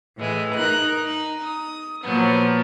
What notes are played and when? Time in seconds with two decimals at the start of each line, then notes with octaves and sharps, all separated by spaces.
0.18 A2 E3 G#3
0.54 D#4 A#4 F#6
1.04 D#4
1.41 D#6
2.02 A#2 F3 F#3 B3